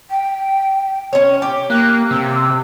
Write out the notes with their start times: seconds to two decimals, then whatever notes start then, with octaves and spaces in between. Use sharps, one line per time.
0.10 G5
1.13 C#4 C#5
1.42 G4 D6
1.70 A#3 F#6
2.11 C3 E6